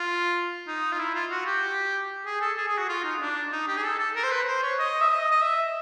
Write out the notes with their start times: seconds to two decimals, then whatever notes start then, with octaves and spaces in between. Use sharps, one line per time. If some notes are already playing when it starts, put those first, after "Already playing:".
Already playing: F4
0.67 D#4
0.92 F4
0.99 E4
1.15 F4
1.31 F#4
1.46 G4
2.25 G#4
2.41 A4
2.57 G#4
2.67 G#4
2.78 F#4
2.89 F4
3.04 D#4
3.21 D4
3.52 D#4
3.68 G4
3.77 G#4
3.84 A4
3.99 A4
4.15 A#4
4.24 C5
4.31 B4
4.47 C5
4.63 C#5
4.79 D#5
5.01 E5
5.10 D#5
5.31 D#5
5.42 E5